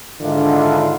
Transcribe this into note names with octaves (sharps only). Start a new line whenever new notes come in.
G#2 D3 D#3 D4 E4 F4